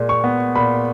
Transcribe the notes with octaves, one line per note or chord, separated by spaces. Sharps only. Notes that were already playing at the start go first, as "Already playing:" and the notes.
Already playing: A#2 G#3
C#6
B3
A#2 B5